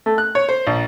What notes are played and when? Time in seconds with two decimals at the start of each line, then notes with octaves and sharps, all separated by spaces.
0.06 A3
0.18 F#6
0.35 C#5
0.49 C5
0.67 A#1